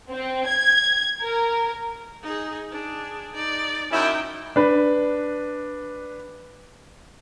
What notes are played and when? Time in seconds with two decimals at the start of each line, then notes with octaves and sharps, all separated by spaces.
0.11 C4
0.48 G#6
1.21 A#4
2.22 D#4 G#4
2.71 D4 G#4
3.34 D#4 D5
3.90 F#2 C#4 D#4 E4 G5
4.56 D4 B4